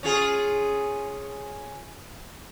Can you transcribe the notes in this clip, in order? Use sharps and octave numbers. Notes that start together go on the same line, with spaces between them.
C#4 F4 G#4